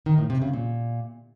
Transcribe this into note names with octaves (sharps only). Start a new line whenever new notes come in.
D#3
A2
C3
C#3
A#2